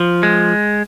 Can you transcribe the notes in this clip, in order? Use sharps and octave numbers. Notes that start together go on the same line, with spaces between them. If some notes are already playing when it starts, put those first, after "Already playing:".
Already playing: F3
G#3